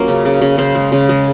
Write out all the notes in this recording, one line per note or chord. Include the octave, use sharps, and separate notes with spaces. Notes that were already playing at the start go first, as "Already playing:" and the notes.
Already playing: F#3 A#3 C#4 F4
C#3
C#3
C#3
C#3 C5
G#3
C#3
G#3